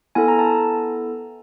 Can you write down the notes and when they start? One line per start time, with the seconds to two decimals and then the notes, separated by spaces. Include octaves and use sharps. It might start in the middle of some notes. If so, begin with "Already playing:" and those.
0.15 B3 E4 A4 G#5
0.28 A#5
0.39 A5